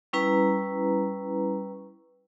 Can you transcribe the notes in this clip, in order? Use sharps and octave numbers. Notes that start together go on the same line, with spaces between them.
G3 C#4 E4 B4 A#5